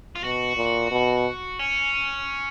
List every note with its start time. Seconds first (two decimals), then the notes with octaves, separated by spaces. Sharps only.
0.15 F4
0.23 B2 F#4
0.57 A#2
0.91 B2
1.59 C#4